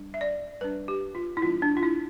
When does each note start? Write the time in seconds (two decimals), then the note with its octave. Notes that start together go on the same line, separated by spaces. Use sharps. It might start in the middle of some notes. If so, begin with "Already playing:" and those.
Already playing: G3 D4
0.14 E5
0.21 D5
0.61 G3 D4 B4
0.88 G4
1.15 F4
1.37 E4
1.42 E3 G3 B3 D4 F4
1.62 D4
1.77 F4
1.83 E4